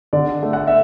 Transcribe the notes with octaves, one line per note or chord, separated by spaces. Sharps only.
D3 D5
A3
F#5
E5